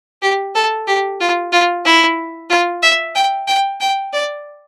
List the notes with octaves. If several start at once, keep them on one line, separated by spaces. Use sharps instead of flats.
G4
A4
G4
F4
F4
E4
F4
E5
G5
G5
G5
D5